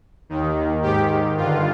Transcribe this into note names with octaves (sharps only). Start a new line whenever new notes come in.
D#2 D#3
G#2 D#3 G4
G2 D3 F4